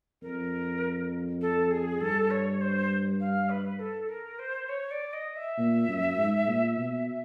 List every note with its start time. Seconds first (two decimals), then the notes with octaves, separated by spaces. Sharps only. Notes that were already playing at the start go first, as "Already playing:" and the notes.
0.22 F2 A#4
1.41 A4
1.71 G#4
2.01 G2 A4
2.31 C#5
2.61 C5
3.20 F5
3.50 B4
3.79 A4
4.09 A#4
4.39 C5
4.69 C#5
4.91 D5
5.13 D#5
5.36 E5
5.58 A#2
5.88 F#2
6.17 G#2
6.47 A#2
6.77 B2